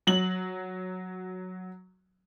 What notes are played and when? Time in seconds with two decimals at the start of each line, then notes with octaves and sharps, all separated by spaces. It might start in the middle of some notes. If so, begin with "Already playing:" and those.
0.07 F#3 F#7